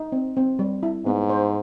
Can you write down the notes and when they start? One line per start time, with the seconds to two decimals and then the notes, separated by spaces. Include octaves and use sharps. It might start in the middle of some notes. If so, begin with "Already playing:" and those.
Already playing: D#4
0.12 C4
0.37 C4
0.59 G3
0.83 E4
1.05 G#2 B3
1.30 C5